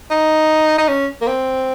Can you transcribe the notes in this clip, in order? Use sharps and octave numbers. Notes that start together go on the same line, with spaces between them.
D#4
D#4
C#4
A#3
C4